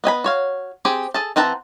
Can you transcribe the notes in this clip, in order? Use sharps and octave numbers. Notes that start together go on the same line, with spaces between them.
B3 D#5 G#5 B5
F#4 C#5 F5
C4 G4 G#4
G#4 A4 A5
E3 C4 F#5 A5 A#5